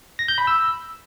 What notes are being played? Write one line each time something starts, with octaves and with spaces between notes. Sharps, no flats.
A#6
G6
B5
E6